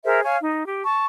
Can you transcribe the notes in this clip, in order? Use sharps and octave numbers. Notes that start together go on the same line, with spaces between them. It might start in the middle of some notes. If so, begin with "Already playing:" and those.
G#4 A#4 C5 E5
C#5 F5 G#5
D#4
G4
A5 C#6